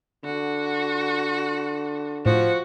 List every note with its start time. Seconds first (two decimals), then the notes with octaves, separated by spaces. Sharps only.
0.24 D3 F#4
2.26 A2 F3 F#4